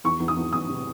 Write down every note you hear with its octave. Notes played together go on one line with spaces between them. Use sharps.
E2 C#6
E2
D#6
E2
E2 D#6
C3